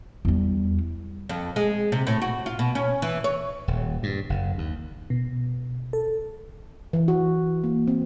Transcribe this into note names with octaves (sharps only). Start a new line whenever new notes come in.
E2 G3
F2
G#3
C3
A2
F#4
F4
B2
C#4
E3
C#5
D#1
G2
F#1
D#2
B2
A4
E3
F#4
A#3
C4